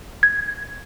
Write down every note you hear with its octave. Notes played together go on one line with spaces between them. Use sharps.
G#6